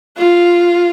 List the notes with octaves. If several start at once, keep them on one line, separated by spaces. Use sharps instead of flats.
F4